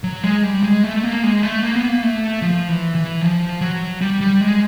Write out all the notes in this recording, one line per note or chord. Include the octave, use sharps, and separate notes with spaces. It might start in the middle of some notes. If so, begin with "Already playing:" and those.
F#3
G#3
G3
G#3
A3
A#3
G#3
A3
A#3
B3
A#3
A3
F3
E3
E3
F3
F#3
G3
G3
G#3